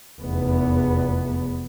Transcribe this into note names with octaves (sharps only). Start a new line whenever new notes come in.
F1 E2 B3